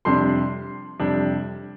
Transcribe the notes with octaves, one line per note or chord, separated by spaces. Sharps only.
F2 C3 G3 D4 C6
F2 C3 G3 D4